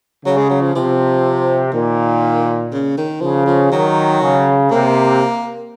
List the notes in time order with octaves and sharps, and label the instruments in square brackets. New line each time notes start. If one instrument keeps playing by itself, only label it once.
[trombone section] C#3 [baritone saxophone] F#3
[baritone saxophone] G#3
F#3
F3
[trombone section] C3 [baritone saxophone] F3
[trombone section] A#2 [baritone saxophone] D#3
[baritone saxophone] C#3
D#3
[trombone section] C#3 [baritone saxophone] F3
[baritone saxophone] F3
[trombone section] D#3 [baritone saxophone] F#3
[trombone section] C#3
[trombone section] C3 [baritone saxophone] A#3